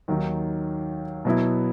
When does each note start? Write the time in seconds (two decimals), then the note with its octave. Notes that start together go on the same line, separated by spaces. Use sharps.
0.08 D#2 D#3 F#3
1.25 B2 F#3 B3 E4